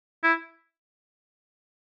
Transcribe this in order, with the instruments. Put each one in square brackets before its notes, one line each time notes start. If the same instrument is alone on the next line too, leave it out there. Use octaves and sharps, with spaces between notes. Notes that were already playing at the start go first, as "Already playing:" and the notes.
[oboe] E4